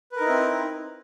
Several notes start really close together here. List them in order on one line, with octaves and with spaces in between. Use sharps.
B4 A#4 D#4 E4 C4